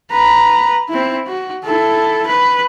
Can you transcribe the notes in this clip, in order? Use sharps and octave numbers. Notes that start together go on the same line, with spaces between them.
B4 A#5
C4 E4
F#4
E4 A4
B4